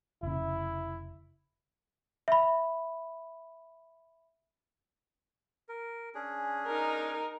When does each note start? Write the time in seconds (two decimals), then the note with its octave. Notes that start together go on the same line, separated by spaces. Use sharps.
0.23 F1 C#3 E4
2.28 E5 B5
5.69 A#4
6.15 C#4 D4 G#4
6.67 D#4 A#4